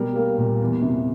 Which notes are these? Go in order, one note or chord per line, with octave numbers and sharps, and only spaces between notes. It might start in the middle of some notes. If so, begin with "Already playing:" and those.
Already playing: B2 G3 A#4
A#3
A#2
E2
C3